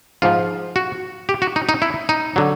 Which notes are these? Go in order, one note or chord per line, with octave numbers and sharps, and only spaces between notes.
G#2 F3 F4
F#4
G4
F#4
D#4
D#4
E4
D#4
D3 F#3